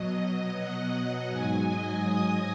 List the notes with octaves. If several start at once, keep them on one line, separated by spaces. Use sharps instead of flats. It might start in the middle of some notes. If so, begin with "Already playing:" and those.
Already playing: B2 F#3 D#5
F#5
F#5
G#2 F#3 G#5
D#5
D#6